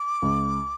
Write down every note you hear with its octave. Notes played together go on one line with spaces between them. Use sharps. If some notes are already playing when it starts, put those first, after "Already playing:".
Already playing: D6
C#2